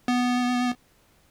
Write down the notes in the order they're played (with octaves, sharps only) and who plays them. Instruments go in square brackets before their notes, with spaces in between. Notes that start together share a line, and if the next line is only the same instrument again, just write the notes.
[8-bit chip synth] B3